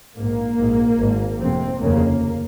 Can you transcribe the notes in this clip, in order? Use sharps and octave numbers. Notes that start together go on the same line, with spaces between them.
A#1 G#2 A#3
A#1 G#2
G#1 G#2
F1 F2 C3 C4
F1 D#2 C#3 A#3